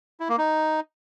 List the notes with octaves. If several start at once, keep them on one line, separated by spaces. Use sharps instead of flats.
E4
A#3
D#4